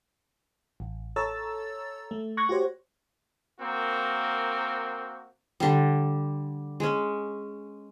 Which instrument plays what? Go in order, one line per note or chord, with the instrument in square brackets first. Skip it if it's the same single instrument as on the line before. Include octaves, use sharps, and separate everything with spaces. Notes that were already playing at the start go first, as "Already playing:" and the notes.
[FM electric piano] A1
A4 C#5 A#5 E6 A6
A3
C#6 F#6 G#6 A#6
F#4 G4 C5 C#5
[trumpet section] A#3 C4 F#4 A#4
[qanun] D3 G3
G#3 C#4